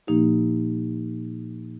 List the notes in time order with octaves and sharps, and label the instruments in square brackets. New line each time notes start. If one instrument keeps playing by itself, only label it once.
[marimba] A#2 F3 A#3 D#4 G4